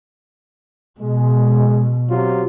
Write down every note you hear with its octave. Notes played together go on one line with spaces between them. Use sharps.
B2 G#3
C3 F#3 F4